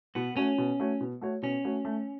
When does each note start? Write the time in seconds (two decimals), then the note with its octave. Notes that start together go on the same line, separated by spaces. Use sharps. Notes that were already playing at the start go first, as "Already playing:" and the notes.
0.15 B2 B3
0.36 A3 C#4 F#4 C#5
0.58 B2
0.80 A3 F#4 C#5
1.01 B2
1.21 A3 F#4 C#5
1.42 B2 C#4
1.64 A3 F#4 C#5
1.85 A3